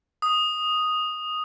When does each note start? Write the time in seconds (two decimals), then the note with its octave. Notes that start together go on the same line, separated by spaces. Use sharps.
0.22 D#6